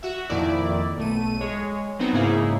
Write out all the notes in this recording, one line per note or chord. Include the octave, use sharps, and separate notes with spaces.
F#4 E5
F2 A#2 D#3 E4 D5
B1 A3 D#7
G#3 C#5
F#3 B3 C4 D#4 F#4
G#2 C#3 A#3 D#4 E4 G#4